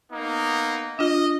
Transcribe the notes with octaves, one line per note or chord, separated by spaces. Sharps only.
A#3 B3 D#4
D4 F4 D#5